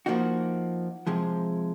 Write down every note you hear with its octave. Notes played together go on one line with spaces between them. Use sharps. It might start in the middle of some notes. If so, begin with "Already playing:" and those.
F3 A#3 D#4 F#4
C3 F3 G#3